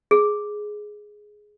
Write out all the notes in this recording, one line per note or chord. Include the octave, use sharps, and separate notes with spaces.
G#4